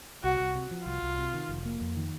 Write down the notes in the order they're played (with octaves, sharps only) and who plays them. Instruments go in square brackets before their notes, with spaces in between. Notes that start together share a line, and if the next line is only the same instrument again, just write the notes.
[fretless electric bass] C2 [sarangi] F#4
[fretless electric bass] C2
C3
F3
[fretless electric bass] C2 [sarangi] F4
[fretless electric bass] C2
C3
D#3
F1
A#3
F2
D#3